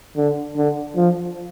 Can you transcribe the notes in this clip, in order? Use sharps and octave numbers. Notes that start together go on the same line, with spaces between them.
D3
D3
F3